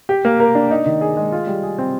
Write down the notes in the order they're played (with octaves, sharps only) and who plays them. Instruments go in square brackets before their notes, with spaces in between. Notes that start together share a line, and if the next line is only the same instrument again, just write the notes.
[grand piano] G4
A#3
A#4
D4
D#4
D#3
G#4
G#3
F4
G3
G#4
C4